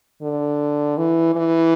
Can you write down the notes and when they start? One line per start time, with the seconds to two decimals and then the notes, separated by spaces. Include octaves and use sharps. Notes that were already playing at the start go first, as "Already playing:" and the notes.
0.22 D3
0.98 E3
1.35 E3